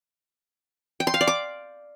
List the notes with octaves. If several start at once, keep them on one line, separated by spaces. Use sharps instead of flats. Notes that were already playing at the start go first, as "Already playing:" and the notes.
G5
C6
F5
D5
D6